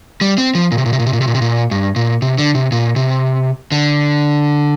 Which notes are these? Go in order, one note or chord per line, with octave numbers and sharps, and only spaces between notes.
G3
C4
F3
A#2
C3
A#2
C3
A#2
C3
A#2
C3
A#2
C3
A#2
G2
A#2
C3
D3
C3
A#2
C3
D3